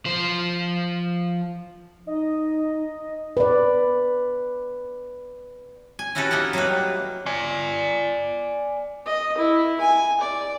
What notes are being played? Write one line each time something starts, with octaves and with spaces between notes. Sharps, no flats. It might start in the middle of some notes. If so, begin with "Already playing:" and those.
F3 C5
D#4 D#5
B4 D5
G#5
C#4 E4 F#4 G4 A4 B4
A#3 D#4 E4 D#5 F#5
F#3 G3 A3 A#3 B4
D5 G#5
D#5
E4
G#5
D5